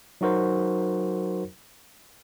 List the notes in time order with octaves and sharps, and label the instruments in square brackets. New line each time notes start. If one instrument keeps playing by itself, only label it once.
[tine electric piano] F#3 D#4 F#4 A#4 C5